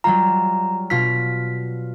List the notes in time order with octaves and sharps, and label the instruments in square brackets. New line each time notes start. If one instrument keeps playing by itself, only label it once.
[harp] F#3 G3 F4 [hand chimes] A#5
[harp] B2 F4 F6 [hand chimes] B6